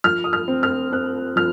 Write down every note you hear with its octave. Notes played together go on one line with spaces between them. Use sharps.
F3 F6
D#6
F6
C4
F6
C4 F#6
F3 F6